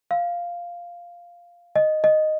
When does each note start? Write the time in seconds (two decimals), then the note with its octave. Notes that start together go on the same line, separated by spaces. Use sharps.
0.11 F5
1.76 D#5
2.04 D#5